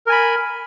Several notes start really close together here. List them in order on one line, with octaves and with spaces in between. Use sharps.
A#4 G#5 B5